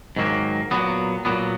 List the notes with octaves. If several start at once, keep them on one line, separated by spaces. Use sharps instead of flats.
G#2 D#3 F#3 A#3
A#2 F#3 B3
A#2 F#3 B3